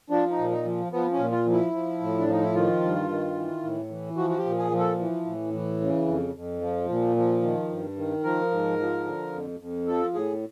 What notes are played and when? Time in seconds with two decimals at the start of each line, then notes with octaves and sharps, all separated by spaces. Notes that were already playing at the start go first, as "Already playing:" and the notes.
0.10 F3 D4
0.31 D#4
0.38 A#2
0.51 D#4
0.65 F3
0.92 F3 B3
1.12 C#4
1.19 A#2
1.32 F4
1.46 F3
1.53 E4
1.73 F3
2.01 A2
2.19 D4
2.27 F3 D#4
2.42 E4
2.54 D#3 F4
2.82 G2
3.09 D#3
3.35 E3
3.63 A2
3.90 E3
4.17 F3 F#4
4.30 F#4
4.38 G4
4.45 A#2
4.59 G#4
4.72 F3
4.79 A4
4.99 E3
5.26 A2
5.53 E3
5.81 C#3
6.07 F2
6.35 F2
6.61 F3
6.89 A#2
7.16 F3
7.42 D#3
7.70 G2
7.97 D#3
8.23 F3 A#4
8.51 G#2
8.79 F3
9.06 D3
9.33 F2
9.60 F2
9.87 F3 A4
10.14 A2 G#4